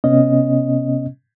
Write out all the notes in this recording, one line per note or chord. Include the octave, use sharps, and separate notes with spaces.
C3 B3 C#4 D#5